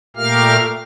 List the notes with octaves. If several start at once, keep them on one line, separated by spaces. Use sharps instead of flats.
A#2 A3 G4 A#4 F5 F6